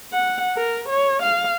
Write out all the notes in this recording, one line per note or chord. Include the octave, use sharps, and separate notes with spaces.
F#5
A#4
C#5
F5